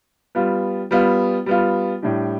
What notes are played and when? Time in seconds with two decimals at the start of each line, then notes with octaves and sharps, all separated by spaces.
0.35 G3 B3 F4
0.91 G3 B3 F4
1.46 G3 B3 F4
2.02 A2 G3 D4 G4